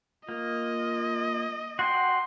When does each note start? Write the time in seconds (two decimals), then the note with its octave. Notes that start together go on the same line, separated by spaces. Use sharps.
0.29 A#3 F4 D#5
1.79 F#4 F#5 G5 C6